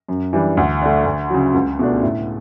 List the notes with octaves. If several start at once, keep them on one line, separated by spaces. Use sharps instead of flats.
F#2
E3 G3 D4
D2
D3 A3
D2
C#3 F#3
C#2
B2 A3 D4
A2